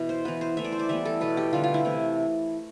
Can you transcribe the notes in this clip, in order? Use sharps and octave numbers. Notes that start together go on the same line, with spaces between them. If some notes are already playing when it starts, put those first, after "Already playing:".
Already playing: B2 E3
C5
E3 B3 B4
C5
E3 A3 E5
D5
C5
D5
E3 G3 B3 E5
A4
B2 A3 B4
G4
D3 G3 B3 F4
F4
E4
C3 E3 A3